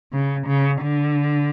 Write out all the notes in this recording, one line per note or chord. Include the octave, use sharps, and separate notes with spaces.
C#3
C#3
D3